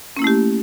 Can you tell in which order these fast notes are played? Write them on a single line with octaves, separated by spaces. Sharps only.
C#4 A#3 E4 A3 G4